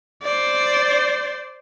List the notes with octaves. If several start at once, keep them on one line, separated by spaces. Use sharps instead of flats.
C5 D5